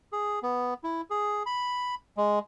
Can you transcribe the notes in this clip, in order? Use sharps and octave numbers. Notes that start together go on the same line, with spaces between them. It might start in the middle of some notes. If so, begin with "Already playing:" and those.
G#4
B3
E4
G#4
B5
G#3